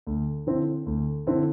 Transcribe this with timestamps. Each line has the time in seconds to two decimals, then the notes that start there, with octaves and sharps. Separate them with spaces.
0.07 D2
0.47 D3 C4 E4
0.86 D2
1.27 D3 C4 E4